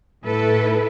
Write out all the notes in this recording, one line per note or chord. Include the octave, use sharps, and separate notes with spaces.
A2 E4 A4 B4